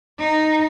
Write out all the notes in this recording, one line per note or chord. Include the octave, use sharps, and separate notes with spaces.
D#4